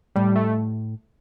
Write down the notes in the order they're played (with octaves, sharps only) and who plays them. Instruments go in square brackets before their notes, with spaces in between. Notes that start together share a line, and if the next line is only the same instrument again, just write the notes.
[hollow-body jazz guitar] A2 [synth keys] G3
[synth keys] A3